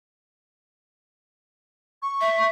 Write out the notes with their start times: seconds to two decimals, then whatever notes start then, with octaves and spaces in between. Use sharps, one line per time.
2.02 C#6
2.21 E5